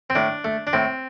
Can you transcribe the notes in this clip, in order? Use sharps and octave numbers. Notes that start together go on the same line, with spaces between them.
C4
A2 D4
A3
D4
A2 C4